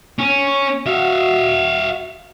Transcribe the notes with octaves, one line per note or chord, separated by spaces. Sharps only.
C#4
F#4 E5 F5